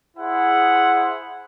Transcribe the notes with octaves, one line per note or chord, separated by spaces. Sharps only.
E4 G#4 C5 F#5